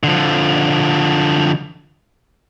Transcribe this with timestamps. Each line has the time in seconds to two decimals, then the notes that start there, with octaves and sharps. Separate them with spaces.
0.03 D3 F3